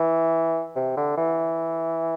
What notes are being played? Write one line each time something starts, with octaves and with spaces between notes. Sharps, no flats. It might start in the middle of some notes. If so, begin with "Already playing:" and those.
Already playing: E3
C3
D3
E3